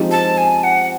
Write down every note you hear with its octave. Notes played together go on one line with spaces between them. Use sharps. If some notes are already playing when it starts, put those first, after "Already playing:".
Already playing: F3 G#3 C4 D#4 G4
A5
G#5
F#5